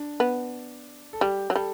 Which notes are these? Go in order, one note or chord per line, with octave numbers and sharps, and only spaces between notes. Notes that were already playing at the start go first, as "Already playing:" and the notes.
Already playing: D4
B3
A4
G3 G4
F#3
G3 A4